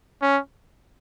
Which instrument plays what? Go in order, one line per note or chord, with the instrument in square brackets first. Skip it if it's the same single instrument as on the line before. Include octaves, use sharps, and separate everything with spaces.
[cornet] C#4